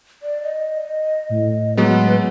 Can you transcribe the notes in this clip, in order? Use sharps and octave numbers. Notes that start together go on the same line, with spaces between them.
D5
D#5
A2
F#3 G#3 B3 B4